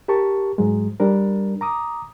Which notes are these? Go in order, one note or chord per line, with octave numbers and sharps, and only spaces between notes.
G4 A#4 A5 C#6
G#2 F#3 G#3
G3 D4 A#4
A#5 D6 D#6